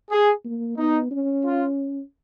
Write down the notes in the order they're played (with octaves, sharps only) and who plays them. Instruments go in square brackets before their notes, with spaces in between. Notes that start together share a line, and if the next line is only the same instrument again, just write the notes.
[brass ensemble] G#4
[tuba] A#3
[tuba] B3 [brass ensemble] D#4
[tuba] C#4
[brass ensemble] F4